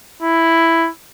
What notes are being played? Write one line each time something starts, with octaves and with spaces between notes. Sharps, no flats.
E4